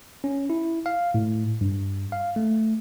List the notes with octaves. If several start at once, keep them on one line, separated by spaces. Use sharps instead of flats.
C#4
E4
F5
A2
G2
F5
A3